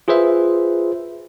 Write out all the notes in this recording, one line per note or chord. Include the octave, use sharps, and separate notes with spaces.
F4 G#4 B4 C5 E5